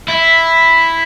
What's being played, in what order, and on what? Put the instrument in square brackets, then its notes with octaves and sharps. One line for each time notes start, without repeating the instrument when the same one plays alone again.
[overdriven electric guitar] E4